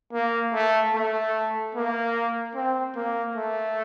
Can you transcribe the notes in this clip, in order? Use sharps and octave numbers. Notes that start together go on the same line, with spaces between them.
A#3
A3
A3
A#3
C4
A#3
A3